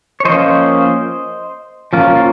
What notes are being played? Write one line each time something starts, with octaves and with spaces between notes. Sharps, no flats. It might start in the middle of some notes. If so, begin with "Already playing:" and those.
C#5
F3 A#3 C#4 C5 D#5
F3 A#3 C#4 F4
F4